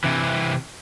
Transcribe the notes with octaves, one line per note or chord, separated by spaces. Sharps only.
C3 E3